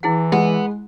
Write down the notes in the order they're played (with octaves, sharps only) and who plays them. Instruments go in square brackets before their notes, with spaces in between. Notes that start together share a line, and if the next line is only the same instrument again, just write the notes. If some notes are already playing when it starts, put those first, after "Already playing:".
[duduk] E3 [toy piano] E4 G#4 F#5
[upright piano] G#3 [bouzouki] B3